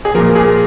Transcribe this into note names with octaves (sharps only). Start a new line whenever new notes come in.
G#4
A#2 F3 A#4
G#4